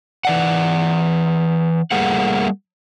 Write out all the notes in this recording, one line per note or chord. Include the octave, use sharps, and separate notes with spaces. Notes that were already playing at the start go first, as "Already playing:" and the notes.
E3 D5 F#5
G3 A3 A#3 G#4 F#5